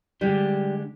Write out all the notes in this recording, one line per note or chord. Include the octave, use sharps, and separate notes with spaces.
D3 G3 G#3 D4 G4